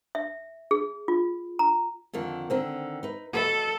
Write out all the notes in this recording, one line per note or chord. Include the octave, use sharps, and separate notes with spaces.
E5
G#4
F4
A#5
F2 D3 D#3
D3 D#3 C4
D#4 B4
F#4 A4 B4 D#5